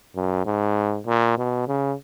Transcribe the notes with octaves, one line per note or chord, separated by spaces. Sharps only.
F#2
G#2
A#2
B2
C#3